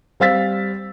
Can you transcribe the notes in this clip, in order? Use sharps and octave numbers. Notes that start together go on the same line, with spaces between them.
G3 C4 F5 E6 A6 B6